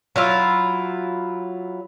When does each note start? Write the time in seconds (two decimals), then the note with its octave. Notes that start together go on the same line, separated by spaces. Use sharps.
0.16 F#3 E4 F4